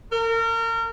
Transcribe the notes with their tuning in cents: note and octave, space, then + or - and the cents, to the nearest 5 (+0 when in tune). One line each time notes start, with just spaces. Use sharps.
A#4 -30